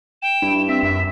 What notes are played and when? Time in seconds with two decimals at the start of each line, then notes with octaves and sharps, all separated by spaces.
0.22 G5 E7
0.42 G2 E4
0.69 C4 E5 B6
0.83 F#2 E5